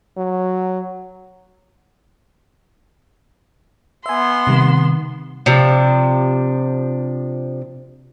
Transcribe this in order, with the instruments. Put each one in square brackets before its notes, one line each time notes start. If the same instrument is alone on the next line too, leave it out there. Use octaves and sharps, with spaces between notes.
[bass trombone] F#3
[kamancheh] B3 C6 [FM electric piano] E5 G#5
[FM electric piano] C3 D#3 G3
[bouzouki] C3 F3 D4